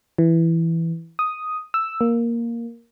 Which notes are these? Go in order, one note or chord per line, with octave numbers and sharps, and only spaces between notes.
E3
D#6
E6
A#3